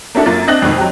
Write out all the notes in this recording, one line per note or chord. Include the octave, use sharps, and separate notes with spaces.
A#3 C#4 D4 E4 F#4 A4
F#2 A#3 F4 A6
C4 D4 D#5 F#6 A#6 F#7
F2 G#2 B2 D#3
F#3 G4